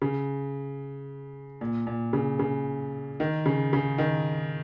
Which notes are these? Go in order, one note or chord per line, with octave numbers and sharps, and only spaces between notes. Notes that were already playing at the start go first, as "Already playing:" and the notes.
C#3
A#2
A#2
C#3
C#3
D#3
C#3
C#3
D#3